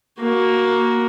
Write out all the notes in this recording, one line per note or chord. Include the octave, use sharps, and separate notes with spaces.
A#3 F#4